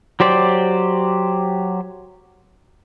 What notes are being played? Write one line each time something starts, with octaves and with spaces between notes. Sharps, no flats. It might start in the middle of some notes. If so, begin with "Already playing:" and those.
F#3 G4 C5 D5